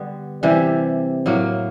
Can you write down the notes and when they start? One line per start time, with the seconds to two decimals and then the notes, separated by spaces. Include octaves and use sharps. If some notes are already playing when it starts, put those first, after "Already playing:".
Already playing: D3 G3 B3
0.43 C3 E3 G3
1.26 A2 F#3 A#3